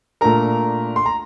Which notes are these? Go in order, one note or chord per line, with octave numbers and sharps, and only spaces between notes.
A#2 A3 D4 A#4 A#5
C6
A#5